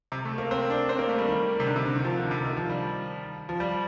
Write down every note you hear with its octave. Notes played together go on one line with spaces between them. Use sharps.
C3
A3
A#3
C4
D4
C4
A#3
A3
G3
D#3
C3
D3
C3
D3
D#3
F3
D3
C3
D#3
F3
G3
F3
G3